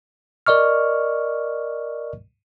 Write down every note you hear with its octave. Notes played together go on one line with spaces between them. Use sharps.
A#4 D5 D#5 C#6 F6